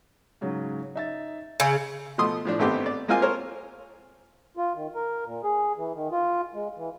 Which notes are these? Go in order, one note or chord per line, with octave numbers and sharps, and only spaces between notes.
G#2 C#3 F#3
D#4 E5 A6
C#3 E6 G6
B2 F3 A3 C6 D#6
A2 F3 D4
G#1 A3 B3 C4 G4 D6
D5
G#3 A#3 C4 F4 F5 G#5
A4 A#4 C5 C#5
F4
D#3
A#4
A#2
G#4
E3
D#3
F4
G#3
E3